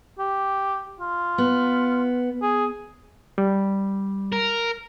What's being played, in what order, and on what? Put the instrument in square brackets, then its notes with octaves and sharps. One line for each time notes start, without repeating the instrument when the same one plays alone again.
[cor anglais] G4
F4
[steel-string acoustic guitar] B3
[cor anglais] G#4
[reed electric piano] G3
[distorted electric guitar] A#4